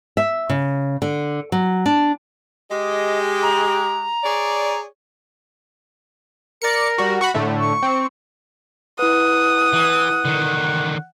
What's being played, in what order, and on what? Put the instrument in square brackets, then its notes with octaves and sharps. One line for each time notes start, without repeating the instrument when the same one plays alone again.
[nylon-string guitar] E5
C#3
D3
F#3
D4
[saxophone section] G#3 G4 [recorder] D#5
[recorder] A#5
[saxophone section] G#4 C#5 D5
[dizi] A#4 [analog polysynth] D5 C#7
[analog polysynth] G3 F#4
F#4 F#5 B5
A2 D3 A3
[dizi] C#6
[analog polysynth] C4
[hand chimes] E4 B4 [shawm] F#5 [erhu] D#6
[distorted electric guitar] E3
D3 D#3